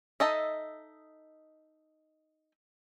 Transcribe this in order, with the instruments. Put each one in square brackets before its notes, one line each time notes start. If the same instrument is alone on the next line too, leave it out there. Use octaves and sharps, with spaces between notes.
[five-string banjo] D#4 A4 D#5 E5